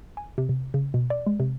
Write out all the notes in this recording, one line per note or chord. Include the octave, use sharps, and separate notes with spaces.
G#5
C3
C3
C#3
B2
D5
G#3
C3